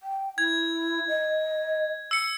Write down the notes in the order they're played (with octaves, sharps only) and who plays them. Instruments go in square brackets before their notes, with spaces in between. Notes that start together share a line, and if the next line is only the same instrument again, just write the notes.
[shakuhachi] G5
[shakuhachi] E4 [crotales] G#6
[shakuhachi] D#5
[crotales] E6 C#7